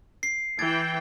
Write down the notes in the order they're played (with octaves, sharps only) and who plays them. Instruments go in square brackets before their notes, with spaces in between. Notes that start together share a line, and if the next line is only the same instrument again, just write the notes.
[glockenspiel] C7
[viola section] E3 G5 [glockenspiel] G#6 A6 D7